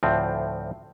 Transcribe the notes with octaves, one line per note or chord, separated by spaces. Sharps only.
D2 A2 F3 C4